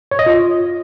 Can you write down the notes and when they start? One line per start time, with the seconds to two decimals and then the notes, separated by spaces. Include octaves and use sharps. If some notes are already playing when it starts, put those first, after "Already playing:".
0.11 C#5
0.19 D#5
0.26 F4